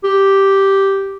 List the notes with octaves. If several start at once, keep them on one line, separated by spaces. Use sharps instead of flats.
G4